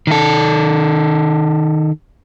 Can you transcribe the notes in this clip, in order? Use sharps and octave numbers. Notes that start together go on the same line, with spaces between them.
D#3 A4